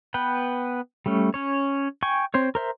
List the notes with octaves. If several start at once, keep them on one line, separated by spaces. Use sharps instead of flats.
B3 B4 G5
G3 A3 C#4
C#4 C#5
G5 G#5 C#6
C4 C5 C#5
A#4 C5 E5